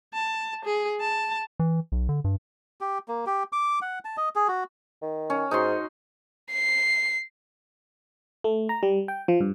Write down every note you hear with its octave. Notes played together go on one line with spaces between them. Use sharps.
A5
G#4
A5
E3
B1
D3
G2
G4
A#3
G4
D6
F#5
A5
D#5
G#4
F#4
D#3
C#4
G#2 D#4 F#4 C6
C7
A3
A#5
G3
G5
F3
G2